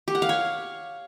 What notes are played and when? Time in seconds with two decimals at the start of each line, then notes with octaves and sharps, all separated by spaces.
0.08 G4
0.15 F#5
0.22 F5
0.29 C#5